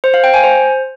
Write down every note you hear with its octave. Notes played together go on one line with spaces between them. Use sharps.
C5
F5
G5
G#5
C5